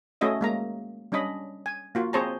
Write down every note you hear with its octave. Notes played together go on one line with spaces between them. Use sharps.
A3 C#4 F#4 D#5 E5
G#3 A#3 A#5
G3 C#4 D4 D#5 B5
G#5
A#3 F4 F#4
C4 G#4 C5 C#5 A5 A#5